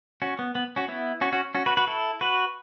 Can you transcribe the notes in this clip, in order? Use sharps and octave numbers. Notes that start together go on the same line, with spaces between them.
C#4 F#4
B3
B3
C#4 F#4
B3 E4
C#4 F#4
C#4 F#4
C#4 F#4
F#4 B4
F#4 B4
E4 A4
F#4 B4